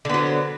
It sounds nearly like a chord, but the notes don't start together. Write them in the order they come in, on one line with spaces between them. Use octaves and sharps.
D3 B3 F#3